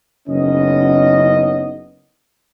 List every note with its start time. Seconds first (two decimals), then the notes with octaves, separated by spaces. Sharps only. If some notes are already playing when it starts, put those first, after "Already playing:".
0.29 F#1 C#3 B3 C#4 D#4 D#5